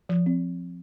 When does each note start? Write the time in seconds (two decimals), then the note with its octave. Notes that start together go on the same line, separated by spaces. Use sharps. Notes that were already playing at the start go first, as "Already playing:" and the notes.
0.09 F3
0.26 C4